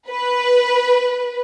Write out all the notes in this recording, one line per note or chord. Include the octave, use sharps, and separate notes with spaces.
B4